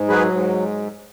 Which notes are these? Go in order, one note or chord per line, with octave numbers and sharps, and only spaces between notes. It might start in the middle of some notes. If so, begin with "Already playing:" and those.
Already playing: G#2
F#3 G#4 B4
G#2